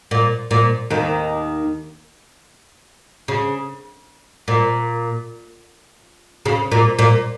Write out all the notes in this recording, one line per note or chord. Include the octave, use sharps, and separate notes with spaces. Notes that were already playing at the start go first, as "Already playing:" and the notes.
A#2
A#2
D#2 D#3
C#3
A#2
C#3
A#2
A#2